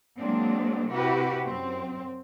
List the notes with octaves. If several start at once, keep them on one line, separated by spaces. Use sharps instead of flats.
F#3 G#3 A#3 C4 D4
C3 E4 F#4 G4 B4
F#2 C4